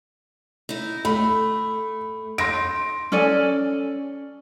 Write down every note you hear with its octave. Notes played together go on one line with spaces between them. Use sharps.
D#4 E4
A3 B5
D#4 C6 A#6 D7
C#4 A4 D5 G#5